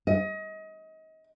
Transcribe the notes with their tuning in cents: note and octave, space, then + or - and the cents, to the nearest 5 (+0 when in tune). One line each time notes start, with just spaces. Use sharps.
D#5 +30